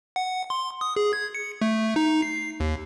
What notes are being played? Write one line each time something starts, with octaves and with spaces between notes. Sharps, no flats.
F#5
C6
D#6
G#4
G#6
C#7
A3
D#4
C7
D#2